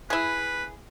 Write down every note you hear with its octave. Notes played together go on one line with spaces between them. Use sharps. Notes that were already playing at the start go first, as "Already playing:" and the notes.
E4 G#4 B4